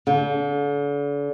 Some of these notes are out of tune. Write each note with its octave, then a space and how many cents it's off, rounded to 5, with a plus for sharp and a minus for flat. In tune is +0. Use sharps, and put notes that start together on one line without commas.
D3 -40